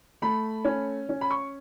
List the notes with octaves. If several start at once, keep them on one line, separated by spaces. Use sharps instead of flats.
A3 B5
C#4
C#4
B5
C#6